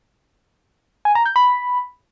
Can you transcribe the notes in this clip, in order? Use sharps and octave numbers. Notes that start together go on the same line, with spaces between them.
G#5
A#5
G6
B5